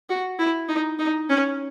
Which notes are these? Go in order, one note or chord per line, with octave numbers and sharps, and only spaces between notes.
F#4
E4
D#4
D#4
C#4